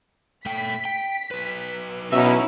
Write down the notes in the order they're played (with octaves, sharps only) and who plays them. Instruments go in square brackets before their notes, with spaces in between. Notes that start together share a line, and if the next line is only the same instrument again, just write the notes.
[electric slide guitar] A3 G5 [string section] B6
[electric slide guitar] G5
F#3 B4
[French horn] B2 [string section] C#4 D#4 E4 [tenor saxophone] E5